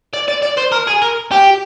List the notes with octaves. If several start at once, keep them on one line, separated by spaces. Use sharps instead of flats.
D5
D5
D5
C5
A#4
G#4
A#4
G4